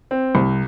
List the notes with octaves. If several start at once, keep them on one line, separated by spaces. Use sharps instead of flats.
C4
C2